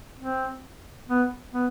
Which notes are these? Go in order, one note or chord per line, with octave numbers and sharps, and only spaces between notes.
C4
B3
B3